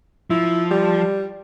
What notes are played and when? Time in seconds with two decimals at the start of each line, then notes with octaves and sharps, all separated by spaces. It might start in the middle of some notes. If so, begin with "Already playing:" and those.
0.30 F3 E4
0.71 G3